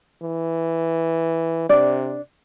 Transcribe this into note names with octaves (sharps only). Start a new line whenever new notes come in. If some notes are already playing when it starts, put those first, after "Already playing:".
E3
C3 D4 D5